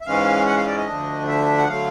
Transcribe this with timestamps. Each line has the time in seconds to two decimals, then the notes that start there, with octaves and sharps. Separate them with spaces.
0.01 E5
0.06 G#2 E3 G#3 C#4 F5
0.46 F#5
0.57 F5
0.67 D5
0.78 D#5
0.87 D2 D3 F3 A3 D4
1.28 E5
1.58 F#5
1.69 D3 F#3 A3 F5